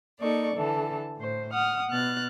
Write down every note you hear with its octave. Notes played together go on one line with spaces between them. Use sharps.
A#3 D#4 A4 D5 C#6
D3 E3 A4 A5
A2 C5
F#5 D#6 F6
B2 B3 F6 F#6 A6